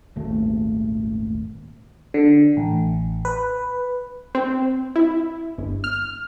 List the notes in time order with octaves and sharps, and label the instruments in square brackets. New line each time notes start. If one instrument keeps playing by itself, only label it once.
[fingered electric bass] D#1 G#1 A3
[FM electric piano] D3
A1
B4
[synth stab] C4
E4
G1
F6